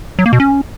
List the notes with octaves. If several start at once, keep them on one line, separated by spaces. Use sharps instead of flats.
F#3
A#3
B2
C#4